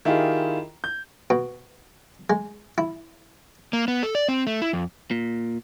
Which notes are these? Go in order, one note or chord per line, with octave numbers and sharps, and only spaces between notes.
D#3 E4 F4 G4 G#4
G6
B2
G#3
E4
A#3
B3
A4
D5
C4
A3
E4
F2
A#2